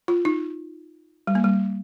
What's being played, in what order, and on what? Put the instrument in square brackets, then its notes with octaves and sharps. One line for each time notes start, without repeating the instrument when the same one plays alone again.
[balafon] F4
D#4
G3
A#3
G3